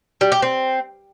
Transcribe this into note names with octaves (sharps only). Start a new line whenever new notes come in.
G3
G4
C4